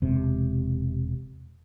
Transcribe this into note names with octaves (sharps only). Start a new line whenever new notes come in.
E1 C3